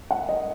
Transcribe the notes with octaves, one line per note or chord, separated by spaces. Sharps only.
F#5
D#5